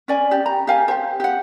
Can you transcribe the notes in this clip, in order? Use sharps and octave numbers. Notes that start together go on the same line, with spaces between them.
C#4 D5 G#5
G4
A#5
G4 F5 G#5
G4 C5
G4 F#5